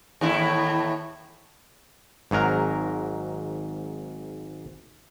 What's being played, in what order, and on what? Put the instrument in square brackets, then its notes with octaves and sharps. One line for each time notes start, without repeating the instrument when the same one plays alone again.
[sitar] D#2 A2 E4
[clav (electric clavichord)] G#1 G#2 F#3 A#4 A#5